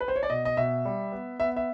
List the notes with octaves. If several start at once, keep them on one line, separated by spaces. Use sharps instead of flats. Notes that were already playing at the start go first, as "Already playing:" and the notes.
B4
C5
C#5
D5
B2 D#5
D#5
B2 E5
G3
B3
B3 E5
E5